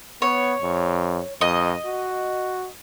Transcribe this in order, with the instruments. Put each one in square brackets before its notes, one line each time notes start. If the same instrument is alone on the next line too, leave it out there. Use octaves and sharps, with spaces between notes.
[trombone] B3 [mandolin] C#5
[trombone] F2
[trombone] F2 [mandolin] D#5
[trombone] F#4